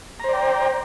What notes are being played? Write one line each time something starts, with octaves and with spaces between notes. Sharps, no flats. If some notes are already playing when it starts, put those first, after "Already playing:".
C5 D5 G5 A#5